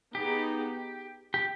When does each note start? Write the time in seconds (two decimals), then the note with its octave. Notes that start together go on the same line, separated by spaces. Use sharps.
0.15 B3 D#4 G4 G#4
1.34 G4